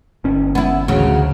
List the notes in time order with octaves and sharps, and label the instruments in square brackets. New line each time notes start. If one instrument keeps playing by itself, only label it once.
[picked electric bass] G1 C#4
[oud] B3 E4
[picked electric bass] A1 D2 [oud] C#3 F#3
[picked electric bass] D2